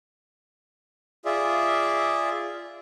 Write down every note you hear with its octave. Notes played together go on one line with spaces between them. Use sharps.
F4 G#4 D5 E5